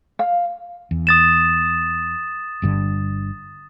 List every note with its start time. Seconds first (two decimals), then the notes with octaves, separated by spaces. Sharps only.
0.19 F5
0.91 E2
1.07 D#6 A6 E7
2.62 G1 G2 D3